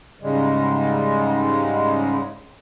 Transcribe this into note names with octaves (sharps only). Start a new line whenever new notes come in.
G#2 C#3 G3 G#3